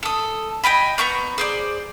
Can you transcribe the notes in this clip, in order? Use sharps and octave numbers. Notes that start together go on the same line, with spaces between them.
A4 D#6
D#5 G5 G#5 B5
B3 A#5 C#6 G6
G#4 C5 D5